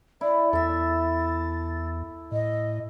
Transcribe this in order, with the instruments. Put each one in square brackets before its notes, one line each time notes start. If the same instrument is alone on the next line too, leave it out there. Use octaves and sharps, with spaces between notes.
[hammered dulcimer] E4 [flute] D5
[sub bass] E2 [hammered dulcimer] A4 E5 [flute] A6
[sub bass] A2 [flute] D#5